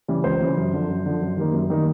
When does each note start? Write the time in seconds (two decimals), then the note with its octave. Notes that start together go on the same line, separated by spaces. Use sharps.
0.08 C#3 E3 G3
0.24 C#2 C5
0.40 C#3 E3 G3
0.57 F#2
0.73 D3 F3
0.88 F#2
1.06 D3 F3
1.22 F#2
1.37 D#3 G3 A#3 D#4
1.53 F#2
1.70 D#3 G3 A#3 D#4